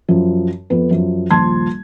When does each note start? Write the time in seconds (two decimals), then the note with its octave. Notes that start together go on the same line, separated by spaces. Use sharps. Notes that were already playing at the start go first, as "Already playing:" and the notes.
0.08 F#2 F3
0.70 F2 B3 B4
0.91 F#2 F3
1.31 D#1 A#1 F3 A5 C6 G#6